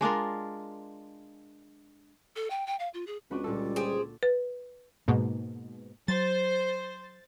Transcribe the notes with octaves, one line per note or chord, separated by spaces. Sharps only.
G#3 D4 F4 A#4
A4
G5
G5
F5
F4
G#4
C#2 C4 D4 F#4 B4
A#2 D3 G3 A4
G4 G#4 C5
B4
G#2 B2 A#3
F#3 C5 A6